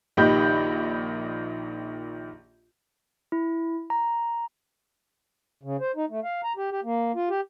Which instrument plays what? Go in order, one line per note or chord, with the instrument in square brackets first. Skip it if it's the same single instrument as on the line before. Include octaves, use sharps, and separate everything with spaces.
[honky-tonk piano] A#1 D#3 G4 D#5 B5 G6
[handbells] E4
A#5
[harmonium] C#3
C5
D#4
A3
F5
A#5
G4
G4
A#3
F4
G4